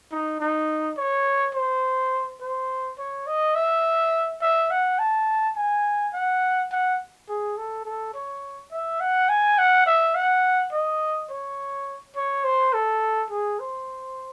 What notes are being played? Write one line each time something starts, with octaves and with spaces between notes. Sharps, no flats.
D#4
D#4
C#5
C5
C5
C#5
D#5
E5
E5
F#5
A5
G#5
F#5
F#5
G#4
A4
A4
C#5
E5
F#5
G#5
F#5
E5
F#5
D#5
C#5
C#5
C5
A4
G#4
C5